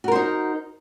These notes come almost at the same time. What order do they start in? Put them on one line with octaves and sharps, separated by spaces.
F#4 A#4 C5 D#4